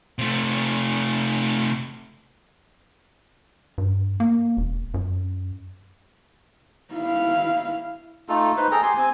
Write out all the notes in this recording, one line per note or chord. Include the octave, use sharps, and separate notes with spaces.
C3 A3
G2
A#3
E1
F#2
E4 F5
A3 D#4 F4 A4
D#4 B4 C5
G#4 A4 G5 A#5
G4 G#5 C6
C4 G#5